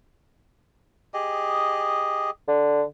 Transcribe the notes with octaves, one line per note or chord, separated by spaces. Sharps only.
G4 G#4 D#5
D3